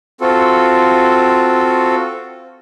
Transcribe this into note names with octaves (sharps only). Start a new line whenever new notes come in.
C4 F4 F#4 A4